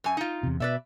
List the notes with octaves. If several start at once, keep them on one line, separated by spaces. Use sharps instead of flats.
F#2 G#5
D#4 F4
E2 C3
B2 B4 D5 E5